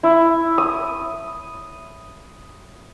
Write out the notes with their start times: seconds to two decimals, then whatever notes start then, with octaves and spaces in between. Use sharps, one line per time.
0.03 E4
0.58 D#6